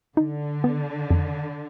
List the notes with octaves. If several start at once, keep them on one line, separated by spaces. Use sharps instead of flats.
D3 D#4
B3
F2